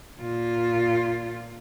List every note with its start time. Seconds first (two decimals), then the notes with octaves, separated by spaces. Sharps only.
0.21 A#2 F4